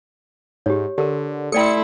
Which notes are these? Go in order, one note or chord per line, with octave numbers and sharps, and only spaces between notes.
G#2 G4 C#5
D3 G4 A#4
A3 E4 A4 D5 G5 C6 C#7